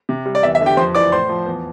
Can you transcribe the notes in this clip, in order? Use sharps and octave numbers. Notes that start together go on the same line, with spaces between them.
C3
G3
D5
E2 E5
E5
D3
G4 G5
F2 C5 C6
E3 D5 D6
A2 C5 C6
F3
E2